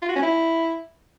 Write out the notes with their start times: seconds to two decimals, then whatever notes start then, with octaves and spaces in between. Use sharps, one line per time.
0.02 F4
0.09 F#4
0.16 C#4
0.22 E4